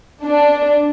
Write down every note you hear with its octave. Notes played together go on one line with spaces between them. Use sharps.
D4